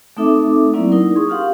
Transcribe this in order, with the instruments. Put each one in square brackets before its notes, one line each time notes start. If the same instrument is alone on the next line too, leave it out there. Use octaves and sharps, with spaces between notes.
[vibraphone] A3 C4 D#4 A4 E5 D6
F#3 A#3 C4 C#4 E4 D5
D#4 E4 A#4
G#4 C6 C#6 D#6
C#4 F4 G4 F5 F#5